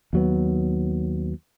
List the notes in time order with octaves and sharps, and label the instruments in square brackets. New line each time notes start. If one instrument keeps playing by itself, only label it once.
[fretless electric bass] D#2 F#3 B3